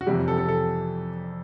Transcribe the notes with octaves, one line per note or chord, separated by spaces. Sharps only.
F#4
F2 C3 E3 G3 G4
A4
A4
A4